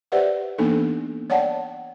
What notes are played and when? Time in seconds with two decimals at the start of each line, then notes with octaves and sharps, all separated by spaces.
0.12 G4 B4 C5 D5 E5 F#5
0.58 E3 A#3 B3 D4 D#4 A4
1.30 C#5 D5 F#5 G5 A5